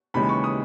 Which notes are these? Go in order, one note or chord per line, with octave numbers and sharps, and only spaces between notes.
D#2 C#3 E3 G#3 B5
C#6
D#6